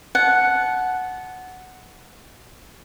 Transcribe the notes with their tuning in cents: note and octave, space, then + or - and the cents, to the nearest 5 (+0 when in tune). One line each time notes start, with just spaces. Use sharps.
F#5 +0 A5 -25